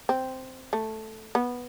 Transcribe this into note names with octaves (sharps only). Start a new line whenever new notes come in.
C4
A3
B3